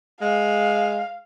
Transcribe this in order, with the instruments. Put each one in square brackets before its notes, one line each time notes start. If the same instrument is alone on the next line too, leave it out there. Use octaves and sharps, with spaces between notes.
[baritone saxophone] G#3 [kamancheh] F5